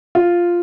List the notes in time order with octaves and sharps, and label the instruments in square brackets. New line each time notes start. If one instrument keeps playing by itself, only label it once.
[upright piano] F4